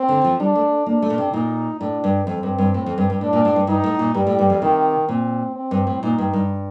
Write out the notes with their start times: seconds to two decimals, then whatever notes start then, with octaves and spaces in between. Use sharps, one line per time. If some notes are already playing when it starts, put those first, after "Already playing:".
Already playing: C4
0.09 D3
0.24 F3
0.40 G3 D4
0.55 A3
0.86 A#3 D4
1.02 A3
1.10 A#2
1.18 C3
1.33 A#2 D#4
1.80 A2 D4
2.04 G2
2.27 F2 C4
2.43 G2
2.58 G2
2.74 A2
2.86 F2
2.98 G2
3.10 G2
3.20 A2 D4
3.33 A#2
3.45 A2
3.56 G2
3.67 G2 D#4
3.84 A2
3.99 A#2
4.14 G2 G3
4.27 A2
4.39 G2
4.50 F2
4.62 C3 D#3
5.09 A#2 C4
5.56 C4
5.71 G2
5.87 A2
6.03 A#2 D#4
6.18 G2
6.33 G2